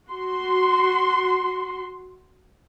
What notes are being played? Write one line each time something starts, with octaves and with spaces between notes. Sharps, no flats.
F#4 C6